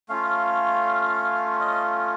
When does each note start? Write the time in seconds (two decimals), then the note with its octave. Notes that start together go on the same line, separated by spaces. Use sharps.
0.09 A3 C#4 F4 F5
1.60 D#5